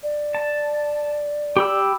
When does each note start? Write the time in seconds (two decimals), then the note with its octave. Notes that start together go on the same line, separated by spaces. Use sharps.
0.03 D5
0.35 A5
1.57 G4 B5 E6